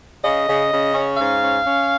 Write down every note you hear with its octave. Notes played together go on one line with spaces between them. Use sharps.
C#3 D#5
C#3
C#3
C#4
G#2 F5
C#4
C#4